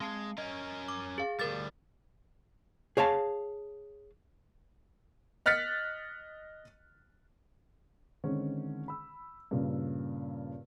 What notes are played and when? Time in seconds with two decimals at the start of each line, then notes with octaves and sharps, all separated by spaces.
0.01 G#3 C4 A5 C7
0.38 C#4 A#4 D#5
0.88 D6
1.18 G#4 F5
1.39 D2 G3 A#4 A6
2.97 G#4 C#5 F5 A5
5.46 D#5 F6 F#6 A6 B6 C#7
8.24 D3 D#3 G#3 C4 C#4
8.88 B5 E6
9.51 G2 A#2 C#3